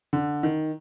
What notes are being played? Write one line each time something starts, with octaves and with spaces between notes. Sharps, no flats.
D3
D#3